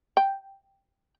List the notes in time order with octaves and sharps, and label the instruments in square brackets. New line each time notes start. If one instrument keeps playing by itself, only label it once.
[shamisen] G5